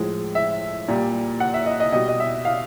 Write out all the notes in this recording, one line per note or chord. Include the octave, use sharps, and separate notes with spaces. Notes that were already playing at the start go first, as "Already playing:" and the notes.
Already playing: A2 F3 G#3
E5
A#2 G3
F#5
E5
D#5
D#5
B2 G3 D#5
D#5
E5
F5